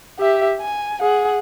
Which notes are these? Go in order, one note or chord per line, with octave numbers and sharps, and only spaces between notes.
G4 E5
G#5
G#4 F#5